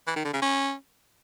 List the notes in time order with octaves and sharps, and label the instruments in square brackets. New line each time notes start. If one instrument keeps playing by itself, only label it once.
[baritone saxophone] E3
D#3
D3
C#3
C#4